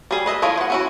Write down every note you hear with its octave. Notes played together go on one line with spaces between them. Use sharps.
G3 G#4
B4 D#5 E5
F3 E4 F4 C#5 D#5
C5 F#5
C#4 E4 F#4